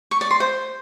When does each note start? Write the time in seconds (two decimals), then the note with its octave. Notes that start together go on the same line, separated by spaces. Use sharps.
0.11 C#6
0.21 D5
0.31 C6
0.40 C5